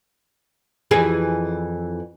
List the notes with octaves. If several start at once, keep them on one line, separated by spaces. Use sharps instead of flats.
F2 E3 G#4